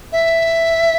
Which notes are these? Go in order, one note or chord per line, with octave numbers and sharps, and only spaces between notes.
E5